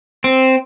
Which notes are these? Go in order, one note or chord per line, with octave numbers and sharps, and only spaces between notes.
C4